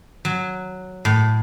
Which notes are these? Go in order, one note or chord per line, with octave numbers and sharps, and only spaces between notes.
F#3
A2